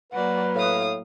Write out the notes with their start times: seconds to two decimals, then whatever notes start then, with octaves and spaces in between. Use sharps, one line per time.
0.12 F#3 A#3 B4 D5 F#5
0.55 A2 F5 D#6